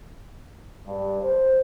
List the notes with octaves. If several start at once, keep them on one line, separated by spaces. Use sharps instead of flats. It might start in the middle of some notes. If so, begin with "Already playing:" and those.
G2
C5